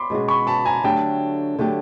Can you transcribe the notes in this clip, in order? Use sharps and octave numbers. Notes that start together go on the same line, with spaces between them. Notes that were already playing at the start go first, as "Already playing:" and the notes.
Already playing: B5 C6 D6
B2 G#3 C#4 F#4
B5 C#6
A5 B5
G#5 A#5
D3 F#3 A3 D4 G4 G5 A5
D3 F#3 A3 D4 G4